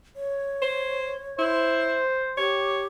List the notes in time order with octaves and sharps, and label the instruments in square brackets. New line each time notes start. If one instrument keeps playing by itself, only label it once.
[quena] C#5
[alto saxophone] C5
[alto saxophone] E4 [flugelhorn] C5
[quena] G4 [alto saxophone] C#5